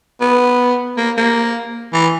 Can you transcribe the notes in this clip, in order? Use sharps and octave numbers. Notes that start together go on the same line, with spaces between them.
B3
A#3
A#3
E3